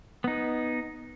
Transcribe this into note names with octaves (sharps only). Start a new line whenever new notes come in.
B3 D#4